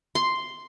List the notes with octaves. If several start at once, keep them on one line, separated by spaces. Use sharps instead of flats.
C6